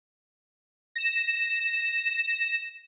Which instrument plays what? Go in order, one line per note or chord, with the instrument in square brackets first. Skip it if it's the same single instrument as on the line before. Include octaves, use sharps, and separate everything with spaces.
[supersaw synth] A#6 E7